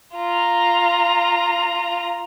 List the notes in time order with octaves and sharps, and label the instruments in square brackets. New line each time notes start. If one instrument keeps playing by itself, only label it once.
[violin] F4 A#5